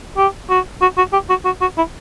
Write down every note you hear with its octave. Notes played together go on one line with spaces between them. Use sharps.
G4
F#4
F#4
F#4
G4
F#4
F#4
F#4
E4